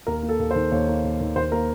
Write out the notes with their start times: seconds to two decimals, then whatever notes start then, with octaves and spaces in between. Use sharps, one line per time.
0.07 D#2 A#4
0.23 A#3
0.29 A4
0.39 D#2
0.51 C5
0.55 D#3
0.72 D#2 C#5
0.88 A#3
1.04 D#2
1.20 D#3
1.36 D#2 C5
1.52 A#3 A#4